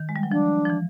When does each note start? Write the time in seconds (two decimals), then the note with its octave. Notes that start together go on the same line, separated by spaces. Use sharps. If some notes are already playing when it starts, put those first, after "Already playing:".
Already playing: D#3
0.09 G#3
0.16 G3
0.23 F#3
0.31 F3 D4
0.65 F3
0.70 E3